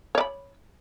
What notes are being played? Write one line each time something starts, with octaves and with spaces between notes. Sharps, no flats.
C#5 D5 B5